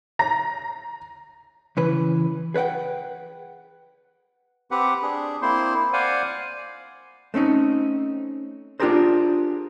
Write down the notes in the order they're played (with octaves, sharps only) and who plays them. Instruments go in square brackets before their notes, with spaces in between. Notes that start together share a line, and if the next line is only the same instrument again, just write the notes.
[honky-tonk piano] A#5 A#6
[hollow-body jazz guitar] C#3 E3 B4
G#4 B4 C#5 F#5 G5
[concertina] C4 G4 B4 F#5
D4 G#4
A#3 C4 E4 C5 C6
C5 D5 F5 F#5 G#5
[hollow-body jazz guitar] A3 C4 C#4 D#4
D4 F4 G4 G#4 A#4 C5